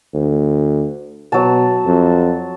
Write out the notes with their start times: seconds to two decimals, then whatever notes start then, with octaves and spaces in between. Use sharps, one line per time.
0.13 D2
1.32 B2 F#3 A5
1.85 F2